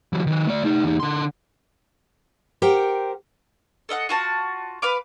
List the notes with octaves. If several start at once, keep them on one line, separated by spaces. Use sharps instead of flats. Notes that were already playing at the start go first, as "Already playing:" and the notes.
E3 F#3
D#3 B4
A3 D5
A3 D#4
E2 D#4
D3 C6
G4 A#4 C5 F#5 G5
A4 D#5 F5 F#5
F4 F#4 A5
B4 F5 D6